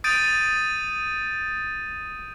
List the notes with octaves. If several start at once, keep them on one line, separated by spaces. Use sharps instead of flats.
D#6 G6 A6 D7 D#7